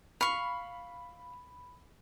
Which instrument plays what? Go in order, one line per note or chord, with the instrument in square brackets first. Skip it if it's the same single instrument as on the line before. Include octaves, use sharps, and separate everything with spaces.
[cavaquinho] F5 C#6 [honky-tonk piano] B5